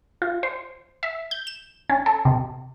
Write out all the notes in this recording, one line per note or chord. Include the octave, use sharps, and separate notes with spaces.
F4
C5
E5
G6
E7
C#4
A4
C3